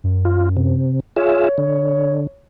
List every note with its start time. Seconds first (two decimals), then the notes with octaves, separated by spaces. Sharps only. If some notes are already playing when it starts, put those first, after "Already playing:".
0.04 F#2
0.25 F4
0.57 C3
1.16 F4 G#4 C#5 E5
1.58 D3